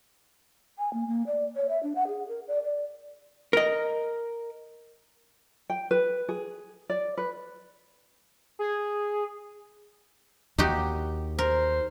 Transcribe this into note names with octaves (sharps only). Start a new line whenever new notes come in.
G#5
A#3
A#3
D5
C#5
E5
D4
F#5
G#4
A#4
D5
D5
A#4 D#5
G5
B4
G#4
D5
B4
G#4
D#2 D#4 F#4 G4
A#4 C5